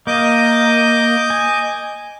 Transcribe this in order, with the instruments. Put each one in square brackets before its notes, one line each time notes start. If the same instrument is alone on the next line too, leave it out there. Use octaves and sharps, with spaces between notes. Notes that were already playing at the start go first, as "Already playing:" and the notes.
[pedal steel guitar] A#3 [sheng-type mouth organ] D#5 D6 G6
[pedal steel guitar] G#5